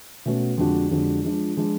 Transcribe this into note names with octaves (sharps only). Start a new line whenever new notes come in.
B2 A3 C#4 F#4
F2 D3 G#3 D4 F#4
F2 D3 G#3 D4 F#4
F3 G#3 D4 F4
F3 G#3 D4 F4